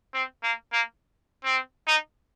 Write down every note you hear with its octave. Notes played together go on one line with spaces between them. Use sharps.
C4
A#3
A#3
C4
D#4